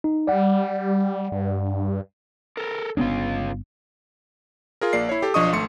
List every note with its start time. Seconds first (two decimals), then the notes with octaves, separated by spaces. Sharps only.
0.04 D#4
0.27 G3 D5 F#5
1.32 G2
2.57 A4 A#4
2.97 G1 C#3 B3 D4 F4
4.81 F4 G#4 A#4
4.93 A#1 A#3 D5 C7
5.09 E4 C#5
5.22 G4 A4
5.34 B1 F3 D4 D#5 C#6 D#6
5.52 G#1 A3 C6 C#7